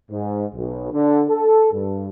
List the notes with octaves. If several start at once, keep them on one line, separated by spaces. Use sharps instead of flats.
G#2
B1
D3
A4
G2